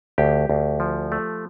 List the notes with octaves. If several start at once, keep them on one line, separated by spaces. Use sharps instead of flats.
D2 G4
D2
F3
A3